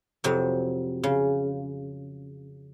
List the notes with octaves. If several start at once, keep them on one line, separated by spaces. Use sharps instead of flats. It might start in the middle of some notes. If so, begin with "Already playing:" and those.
F2 C3 F#3
C#3